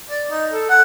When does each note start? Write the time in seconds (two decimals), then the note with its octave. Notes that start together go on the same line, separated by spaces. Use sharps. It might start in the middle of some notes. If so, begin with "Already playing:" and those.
0.10 D5
0.30 D#4
0.52 A4
0.70 F#5